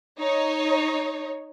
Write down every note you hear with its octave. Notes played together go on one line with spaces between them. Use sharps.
D#4 C#5